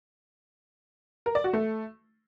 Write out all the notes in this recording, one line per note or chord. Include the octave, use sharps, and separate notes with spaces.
A#4
D5
F#4
A3